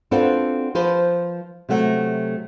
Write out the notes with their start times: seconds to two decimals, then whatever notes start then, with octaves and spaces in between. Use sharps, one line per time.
0.11 C4 D4 F4 F#4 A4 B4
0.75 F3 B4 C5
1.69 C3 F#3 A3 F#4